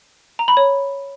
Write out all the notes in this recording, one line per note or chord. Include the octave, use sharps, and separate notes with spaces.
A#5
B5
C#5